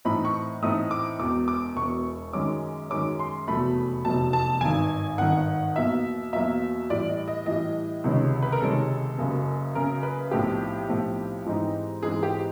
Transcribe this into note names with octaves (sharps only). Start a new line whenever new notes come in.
A2 E3 A3 C4 D#4 B5
C#6
A2 E3 A3 C4 D#4 D#6
D6
E1 E2 B2 D6
D6
E1 E2 B2 C#6
F#2 D#3 G#3 C#4 D6
F#2 D#3 G#3 C#4 D6
C6
F1 E2 B2 F#3 A3 B5
F1 E2 B2 F#3 A3 A5
A5
G#1 G2 D#3 G#5
G#1 G2 D#3 F#5
E2 B2 F#3 A#3 E5
E2 B2 F#3 A#3 E5
A2 E3 G3 D5
D#5
D#5
A2 E3 G3 D#5
C#2 C3 D#3 G#3 C#4
B4
A#4
C#2 C3 D#3 G#3 C#4 A4
F#1 F#2 C#3
F#1 F#2 C#3 A#4
B4
B1 A2 F3 A3 C4 G4
B1 A2 F3 A3 C4
G#2 E3 G#3 C4 D#4
G#2 E3 G#3 C4 D#4 G#4
G4